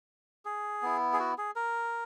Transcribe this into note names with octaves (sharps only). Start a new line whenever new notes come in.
G#4
B3 E4
G#4
F#4
G#4
A#4